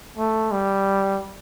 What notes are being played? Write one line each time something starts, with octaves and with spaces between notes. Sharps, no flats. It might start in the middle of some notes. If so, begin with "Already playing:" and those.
A3
G3